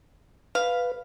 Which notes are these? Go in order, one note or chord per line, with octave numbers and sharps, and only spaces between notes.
B4 F5